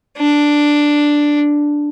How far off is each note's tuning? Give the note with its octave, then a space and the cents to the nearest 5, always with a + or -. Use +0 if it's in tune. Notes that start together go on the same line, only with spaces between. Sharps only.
D4 +0